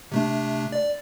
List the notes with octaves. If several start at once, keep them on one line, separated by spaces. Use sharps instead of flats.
C3 A3 D4
D5